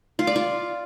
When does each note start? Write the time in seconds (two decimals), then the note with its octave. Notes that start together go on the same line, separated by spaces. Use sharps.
0.19 F4
0.27 D5
0.36 F4